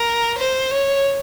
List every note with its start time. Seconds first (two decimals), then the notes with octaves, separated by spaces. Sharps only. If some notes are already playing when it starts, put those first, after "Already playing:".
Already playing: A#4
0.38 C5
0.71 C#5